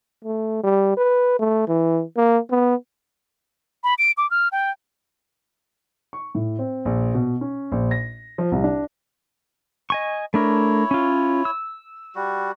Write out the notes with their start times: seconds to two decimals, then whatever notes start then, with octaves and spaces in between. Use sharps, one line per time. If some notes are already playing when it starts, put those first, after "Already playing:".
0.25 A3
0.64 G3
0.97 B4
1.39 A3
1.68 E3
2.17 A#3
2.51 B3
3.84 B5
3.98 D7
4.18 D6
4.31 F6
4.52 G5
6.13 C#6
6.35 A2
6.59 C4
6.85 A#1
7.14 B2
7.41 C#4
7.72 A#1
7.91 A#6
8.38 F3
8.52 C2
8.64 D4
9.90 D#5 G#5 C#6
10.34 A3 D4 E4 A#4 C#5
10.91 C#4 F4
11.45 E6
12.15 G3 F#4